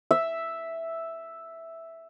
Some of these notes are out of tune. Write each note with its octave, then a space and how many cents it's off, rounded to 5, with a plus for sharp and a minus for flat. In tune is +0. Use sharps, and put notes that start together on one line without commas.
E5 +0